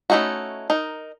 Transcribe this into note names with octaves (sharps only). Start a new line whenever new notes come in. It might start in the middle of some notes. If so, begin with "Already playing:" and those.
A3 C#4 D#4 E4 F#4
D#4 A#4